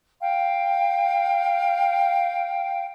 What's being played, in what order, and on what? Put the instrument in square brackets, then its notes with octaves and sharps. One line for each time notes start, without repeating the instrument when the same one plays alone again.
[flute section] F5 G5